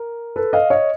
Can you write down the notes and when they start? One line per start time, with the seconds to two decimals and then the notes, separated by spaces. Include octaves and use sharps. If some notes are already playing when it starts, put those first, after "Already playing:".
Already playing: A#4
0.36 A4 B4
0.53 D#5 F5
0.70 C#5 D#5